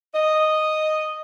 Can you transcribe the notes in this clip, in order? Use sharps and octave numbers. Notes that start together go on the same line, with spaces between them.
D#5